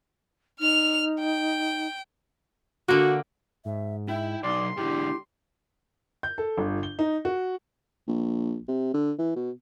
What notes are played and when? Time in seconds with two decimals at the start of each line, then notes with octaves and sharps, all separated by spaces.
0.60 D#4 F6 F7
1.20 G5
2.88 D3 A#3 F#4
3.65 G#2 E5
4.09 E4 E5 G5
4.43 B1 D#4 D5 C6
4.77 G#2 D3 E4 G4
6.23 G6
6.38 A4
6.57 G1
6.83 G7
6.99 D#4
7.25 F#4
8.08 A#1
8.68 C3
8.94 D3
9.19 E3
9.36 B2